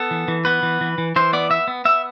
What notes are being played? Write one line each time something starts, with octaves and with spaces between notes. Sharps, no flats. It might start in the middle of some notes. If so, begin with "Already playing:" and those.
Already playing: B3 A4
E3
E3
B3 B4
E3
E3
E3
E3 C5
B3 D5
B3 E5
B3
B3 E5